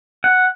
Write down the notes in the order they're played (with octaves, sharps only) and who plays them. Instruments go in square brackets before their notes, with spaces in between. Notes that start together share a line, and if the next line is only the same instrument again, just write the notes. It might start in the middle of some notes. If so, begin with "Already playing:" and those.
[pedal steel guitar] F#5